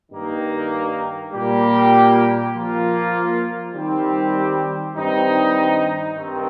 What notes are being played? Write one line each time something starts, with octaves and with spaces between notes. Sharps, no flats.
G2 D#3 A#3 D#4
A#2 G3 A#3 G4
F3 A#3 F4
D#3 G3 C4 G4
G2 D#3 G3 C4 D#4
G2 D#3 C4